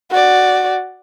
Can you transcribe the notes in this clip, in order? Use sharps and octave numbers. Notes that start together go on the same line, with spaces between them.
F#4 D5